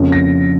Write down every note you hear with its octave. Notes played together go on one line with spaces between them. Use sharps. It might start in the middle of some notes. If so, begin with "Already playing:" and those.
Already playing: F2 C#3 F3 A#3 C#4
A#6